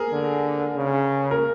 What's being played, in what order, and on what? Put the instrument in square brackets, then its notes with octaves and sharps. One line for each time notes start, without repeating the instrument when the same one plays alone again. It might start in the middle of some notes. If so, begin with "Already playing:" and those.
Already playing: [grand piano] G#4 A#4
[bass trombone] D3
C#3
[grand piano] A#4